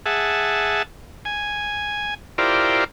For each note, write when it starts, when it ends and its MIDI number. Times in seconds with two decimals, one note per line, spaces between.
0.06 0.83 68
0.06 0.83 76
0.06 0.83 78
0.06 0.83 81
1.25 2.14 80
2.38 2.84 64
2.38 2.84 65
2.38 2.84 67
2.38 2.84 70
2.38 2.84 72
2.38 2.84 74